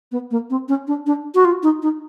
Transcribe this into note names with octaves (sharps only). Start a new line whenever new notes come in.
B3
A#3
C4
C#4
D4
D4
F#4
F4
D#4
D#4